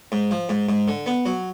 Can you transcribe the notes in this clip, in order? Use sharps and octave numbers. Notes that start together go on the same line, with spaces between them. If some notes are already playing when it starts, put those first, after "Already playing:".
G#2
F3
G#2
G#2
D3
B3
F#3